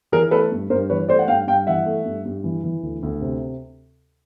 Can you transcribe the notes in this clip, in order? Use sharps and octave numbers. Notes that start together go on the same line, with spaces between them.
E3 G#4 A#4
A3 A4 B4
G2
G2 A#4 C5
E3 B4 C#5
A3 C5 D5
F#5
G2 F5 G5
G2 F5 G5
E3 E5 F#5
A3
G2
G2
E3
E3
D2
D2
C3